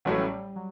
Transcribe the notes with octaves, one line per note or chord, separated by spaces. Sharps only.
A1 A2 F#3 G#3 A3 C#4
G3
G3
F#3